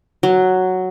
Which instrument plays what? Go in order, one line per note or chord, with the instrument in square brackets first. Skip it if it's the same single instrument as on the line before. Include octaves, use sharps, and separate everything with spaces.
[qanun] F#3